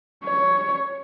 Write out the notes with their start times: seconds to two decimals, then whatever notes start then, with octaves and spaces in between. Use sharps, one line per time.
0.25 C#5